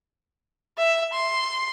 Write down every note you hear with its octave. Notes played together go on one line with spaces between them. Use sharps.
E5
C6